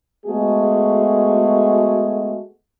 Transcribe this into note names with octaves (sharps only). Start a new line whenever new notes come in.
G#3 A3 B3 F#4 G#4